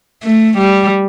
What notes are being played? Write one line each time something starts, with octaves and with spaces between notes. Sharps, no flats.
A3
G3